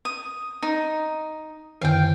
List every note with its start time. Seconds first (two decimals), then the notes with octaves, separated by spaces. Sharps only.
0.05 D#6
0.63 D#4
1.81 F#2 D3 D#3 F5 G5